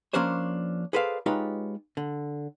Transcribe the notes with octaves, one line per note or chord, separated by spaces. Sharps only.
F3 A#3 C#4 D4 C5 C#5
G#4 A4 B4 C5 D5 F5
G#3 D#4 F4 G4 B4 C#5
D3